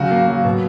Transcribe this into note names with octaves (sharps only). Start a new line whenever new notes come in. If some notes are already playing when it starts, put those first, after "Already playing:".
Already playing: C#3 F#3 F#4
A#3
F#3
B2